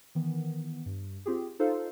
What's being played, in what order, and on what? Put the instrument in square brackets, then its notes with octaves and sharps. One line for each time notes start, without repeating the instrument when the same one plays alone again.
[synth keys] D#3 E3 B3
G2
C4 F4 G4 G#4
D#4 F4 A4 C5 F5